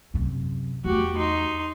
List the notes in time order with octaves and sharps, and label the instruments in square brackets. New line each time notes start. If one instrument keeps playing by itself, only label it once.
[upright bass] F#2 C3
[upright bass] E2 A3 [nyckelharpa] F#4 G4
[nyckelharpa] D#4 C6